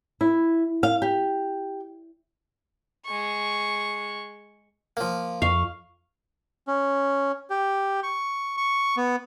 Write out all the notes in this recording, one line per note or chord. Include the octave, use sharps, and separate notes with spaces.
E4
F5
G4
G#3 C#6
F3 A#3
F2 F5 C#6
C#4
G4
C#6
C#6
B3